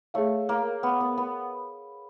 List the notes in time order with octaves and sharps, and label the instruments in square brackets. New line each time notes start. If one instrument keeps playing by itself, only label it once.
[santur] A3 [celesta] G#4 C#5 F5
[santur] A#3
B3
B3
B3